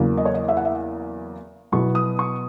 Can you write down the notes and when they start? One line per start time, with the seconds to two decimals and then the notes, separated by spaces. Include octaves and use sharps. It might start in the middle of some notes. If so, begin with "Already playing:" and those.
Already playing: E2 C#3 F#3 A#3
0.17 D#5
0.25 C#5
0.34 D#5
0.48 E5
0.57 F#5
0.65 E5
1.72 B2 F#3 B3 E4 C#6
1.95 D#6
2.19 C#6